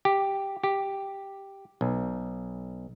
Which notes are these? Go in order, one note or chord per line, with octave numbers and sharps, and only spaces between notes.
G4
G4
B1